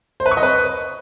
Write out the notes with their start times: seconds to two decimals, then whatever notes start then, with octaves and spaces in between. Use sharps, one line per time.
0.20 C5
0.26 B4
0.31 C#6
0.37 D#5
0.43 B4